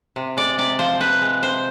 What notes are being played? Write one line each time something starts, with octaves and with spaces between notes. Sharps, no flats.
C3
G#3 D5
C3 D5
F3 C5
C3 B4
G#3
C3 C5